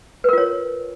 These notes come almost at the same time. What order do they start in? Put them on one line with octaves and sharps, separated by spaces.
B4 A#4 F4 C#5